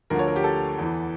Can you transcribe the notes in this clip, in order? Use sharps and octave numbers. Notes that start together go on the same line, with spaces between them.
D2 D3 F3 A#4
C#5
A#4
G4
A4
E2 E3